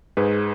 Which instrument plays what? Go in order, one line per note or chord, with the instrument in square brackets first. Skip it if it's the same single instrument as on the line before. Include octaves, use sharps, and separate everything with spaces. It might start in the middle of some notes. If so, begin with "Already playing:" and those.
[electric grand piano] G#2 G#4 B4